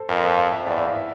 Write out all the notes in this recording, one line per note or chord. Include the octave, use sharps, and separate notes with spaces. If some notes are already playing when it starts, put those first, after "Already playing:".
Already playing: A4 C5
F2 A#4
C5
F5
E5
E2 D5
E5
F5
E5